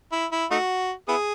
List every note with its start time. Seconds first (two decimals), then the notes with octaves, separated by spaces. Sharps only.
0.12 E4
0.32 E4
0.51 A3 D#4 F#4
1.08 B3 E4 G#4